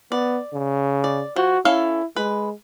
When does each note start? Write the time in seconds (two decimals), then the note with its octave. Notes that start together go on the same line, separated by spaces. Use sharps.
0.12 B3 D5
0.53 C#3
1.04 D5
1.36 F3 F#4
1.65 C#4 E4 A4 F5
2.16 G#3 B4